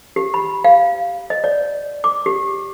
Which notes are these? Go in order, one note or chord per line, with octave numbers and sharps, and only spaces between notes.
G4
B5
F5
D#5
D5
D6
G4